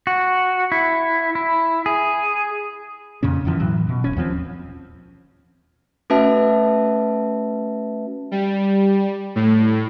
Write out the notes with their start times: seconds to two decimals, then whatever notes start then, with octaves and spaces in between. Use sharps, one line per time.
0.07 F#4
0.72 E4
1.35 E4
1.86 G#4
3.23 F2 A#2 C#3 C#4
3.45 F#2 D3 E3 F3
3.60 A2 E3 F#3
3.89 B2
4.04 D#1 C#4
4.16 D#2 F3 C4
6.10 A3 C#4 F#4 B4 E5 A5
8.31 G3
9.35 A2